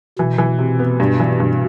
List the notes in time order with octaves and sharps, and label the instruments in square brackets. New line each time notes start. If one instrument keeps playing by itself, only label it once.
[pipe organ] B2 [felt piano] E3
[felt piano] E3
C3
B3
G2
E3
G2